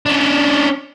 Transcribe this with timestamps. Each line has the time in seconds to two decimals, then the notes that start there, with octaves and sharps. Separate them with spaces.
0.06 C#4 D4